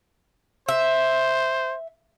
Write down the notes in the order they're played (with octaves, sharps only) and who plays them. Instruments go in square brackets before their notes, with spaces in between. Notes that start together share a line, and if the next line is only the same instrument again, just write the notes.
[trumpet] C5 [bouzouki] E5